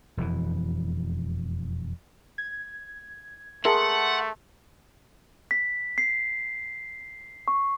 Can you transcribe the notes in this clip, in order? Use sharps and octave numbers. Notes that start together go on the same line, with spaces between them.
E1 F2 E3
G#6
A3 G#4 A#4 E5 F#5 A5 C6
B6
C7
C#6